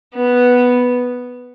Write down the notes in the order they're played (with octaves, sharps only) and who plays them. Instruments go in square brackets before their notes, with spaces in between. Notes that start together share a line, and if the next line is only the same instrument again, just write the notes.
[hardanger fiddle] B3